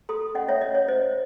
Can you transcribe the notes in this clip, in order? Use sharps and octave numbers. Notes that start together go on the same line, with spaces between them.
A4 C6 D#6
C#4 D#5 F#5
C#5 E5
C#4 D#5
C#5
C5 D#5